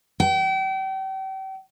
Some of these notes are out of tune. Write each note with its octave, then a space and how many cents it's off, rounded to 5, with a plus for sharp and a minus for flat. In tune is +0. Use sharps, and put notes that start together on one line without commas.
G5 -35